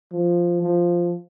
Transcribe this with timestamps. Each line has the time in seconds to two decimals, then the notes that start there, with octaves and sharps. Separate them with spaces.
0.13 F3
0.63 F3